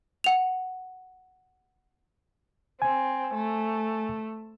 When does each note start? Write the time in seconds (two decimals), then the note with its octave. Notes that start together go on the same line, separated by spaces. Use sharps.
0.24 F#5 F7
2.82 C4 G#5
3.34 A3